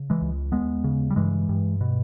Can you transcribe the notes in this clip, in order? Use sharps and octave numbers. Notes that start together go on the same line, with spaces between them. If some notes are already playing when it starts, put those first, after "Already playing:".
Already playing: C#3
E3 G#3
C#2
D#2 G#3 B3
C#3
G3
G2 E3 G#3
G2
B2